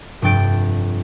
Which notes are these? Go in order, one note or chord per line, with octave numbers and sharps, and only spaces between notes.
F1 G2 G5 A6 D7